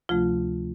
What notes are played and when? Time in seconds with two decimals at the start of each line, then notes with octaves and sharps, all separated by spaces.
0.09 D2 C3 F3 A3 F4